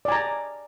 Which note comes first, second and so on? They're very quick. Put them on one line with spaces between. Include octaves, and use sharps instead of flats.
D5 G#5 A#5